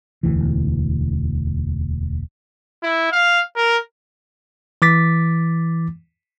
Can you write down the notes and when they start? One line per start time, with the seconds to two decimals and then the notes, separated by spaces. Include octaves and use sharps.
0.23 E1 D2 E3
2.83 E4
3.12 F5
3.56 A#4
4.82 E3 D6 A6 B6